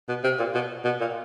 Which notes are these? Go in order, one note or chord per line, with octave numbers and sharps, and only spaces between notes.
B2
C3
A#2
B2
B2
A#2